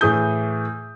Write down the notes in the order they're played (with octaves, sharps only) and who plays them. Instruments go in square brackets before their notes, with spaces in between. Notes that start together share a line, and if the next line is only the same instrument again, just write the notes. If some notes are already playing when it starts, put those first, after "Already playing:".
[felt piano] A2 E3 G#4 D#6 G6